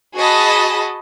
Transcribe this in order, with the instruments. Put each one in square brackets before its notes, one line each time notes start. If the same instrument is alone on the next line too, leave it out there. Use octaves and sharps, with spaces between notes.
[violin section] F#4 G#4 D#5 A5 B5